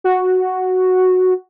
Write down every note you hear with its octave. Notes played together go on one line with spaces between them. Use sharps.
F#4